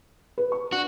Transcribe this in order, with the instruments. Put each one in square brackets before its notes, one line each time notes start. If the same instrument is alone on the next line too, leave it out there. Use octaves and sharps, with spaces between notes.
[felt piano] B4
C#6
[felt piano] D4 [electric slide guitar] F#4